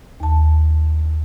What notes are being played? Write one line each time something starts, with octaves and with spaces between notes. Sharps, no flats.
D#2 A5